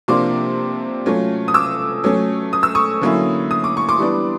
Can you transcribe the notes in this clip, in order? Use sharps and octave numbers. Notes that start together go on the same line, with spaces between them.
C3 F3 A#3 D4 C6 D6
F#3 A3 C#4 F4
D#6
D6 E6
F#3 A3 C#4
D#6
E6
C#6 D#6
D3 F#3 A#3 C#4 E4
D#6
D6
C#6
C6 D6
E3 G3 B3 D4